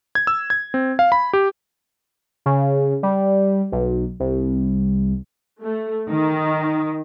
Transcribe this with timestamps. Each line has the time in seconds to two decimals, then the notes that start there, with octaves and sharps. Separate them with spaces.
0.15 G#6
0.27 E6
0.50 G#6
0.74 C4
0.99 F5
1.12 B5
1.33 G4
2.46 C#3
3.03 G3
3.72 B1
4.20 C2
5.64 A3
6.11 D#3